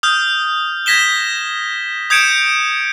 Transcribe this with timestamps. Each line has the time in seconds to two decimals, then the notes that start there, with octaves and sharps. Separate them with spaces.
0.03 D#6 F6 G6
0.86 G#6 A#6 B6 E7 G7
2.10 D#6 G6 G#6 C#7 D7 E7